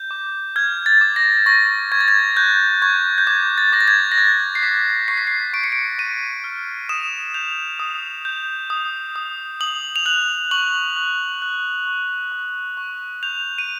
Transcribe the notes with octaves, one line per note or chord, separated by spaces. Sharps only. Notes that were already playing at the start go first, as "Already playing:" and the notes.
Already playing: G6
D6
F6 G#6
A6
D6
A#6
C#6 A#6
C#6 G#6
A6
G#6
F#6 G6
C#6 G#6
G6
D6 G#6
A6
D6 A#6
A6
G#6
A#6
F#6 A6
C7
D6 B6
C#6 C7
B6
C7
C#6 D7
C#7
D7
C#6 D#7
F6
D#6 E7
G6 F7
D#6
G6
D#6
D#6
D#6 F#7
F7
F#6 F#7
C#6 F#7
F#6
F#6
C#6
C#6
C#6
G6 F7
D#7